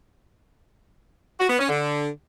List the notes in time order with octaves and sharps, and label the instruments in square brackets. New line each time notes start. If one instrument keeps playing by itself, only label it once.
[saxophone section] F#4
B3
C#4
D3